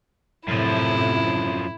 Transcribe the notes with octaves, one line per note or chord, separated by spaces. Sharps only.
F#2 A2 C3 F3 E4